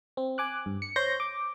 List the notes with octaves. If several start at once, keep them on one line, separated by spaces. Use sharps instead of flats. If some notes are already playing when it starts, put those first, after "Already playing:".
C4
G#5 D6 F#6
G2
C#7
C5 C#5 C6 G6 A#6
D6